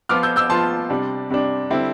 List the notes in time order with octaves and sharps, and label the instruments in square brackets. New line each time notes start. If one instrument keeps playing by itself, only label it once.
[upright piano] F3 B3 F4 D6 F6
E6 G6
E6 G6
F3 B3 F4 A5 C6
C3 G3 D4
C3 G3 D4
D3 G3 C4 E4